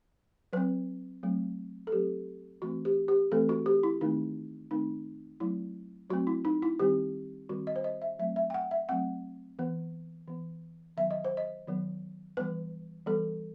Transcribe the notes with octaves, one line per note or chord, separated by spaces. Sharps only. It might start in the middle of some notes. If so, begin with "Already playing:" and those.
F#3 C4 B4
F#3 A3 C4
A4
F#3 A3 C4 G4
E3 A3 C4 F#4
G4
G4
E3 A3 C4 A4
F#4
G4
E4
D#3 A3 C4 D#4
D#3 A3 C4 D#4
F#3 A3 C4 E4
F#3 A3 C4 F#4
E4
D#4
E4
D#3 G3 C4 G4
D#3 G3 C4 F#4
D#5
C5
D#5
E5
F#3 A3 C4 E5
E5
G5
F#5
E5
F#3 A3 C4 F#5
E3 B3
E3 B3
D#3 F#3 B3 E5
D#5
C5
D#5
D#3 F#3 B3
E3 G3 B3 B4
E3 G3 B3 A4